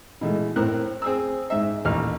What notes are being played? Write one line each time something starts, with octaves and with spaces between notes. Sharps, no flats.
B2 E3 G#3 A3
A2 C4 A#4 F#6
C4 G#4 E6
G#2 E5
A1 D#2 F6